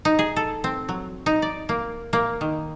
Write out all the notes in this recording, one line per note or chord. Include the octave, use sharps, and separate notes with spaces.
D#4
G#4
A4
C4
F#3
D#4
D5
A#3
A#3
D#3